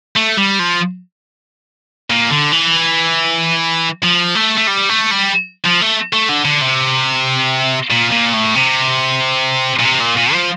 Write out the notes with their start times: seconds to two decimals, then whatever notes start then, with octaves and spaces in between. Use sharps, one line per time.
0.16 A3
0.37 G3
0.59 F3
2.10 A#2
2.31 D3
2.52 E3
4.03 F3
4.35 A3
4.58 A3
4.68 G3
4.89 A3
5.11 G3
5.65 F3
5.81 A3
6.13 A3
6.29 D3
6.45 D3
6.62 C3
7.91 A#2
8.12 A#2
8.34 A2
8.55 C3
9.80 A#2
9.85 C3
10.00 A#2
10.17 A#2
10.33 F3